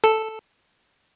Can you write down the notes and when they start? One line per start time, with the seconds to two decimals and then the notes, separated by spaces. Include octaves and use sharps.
0.04 A4